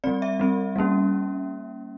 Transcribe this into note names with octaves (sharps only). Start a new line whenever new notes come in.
G3 C4 D5
E5
G3 C4
G3 A#3 C#4